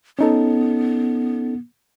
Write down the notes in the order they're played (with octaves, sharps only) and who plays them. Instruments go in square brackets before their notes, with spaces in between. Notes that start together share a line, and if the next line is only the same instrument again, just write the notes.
[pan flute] B3 [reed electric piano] C#4 D#4 A4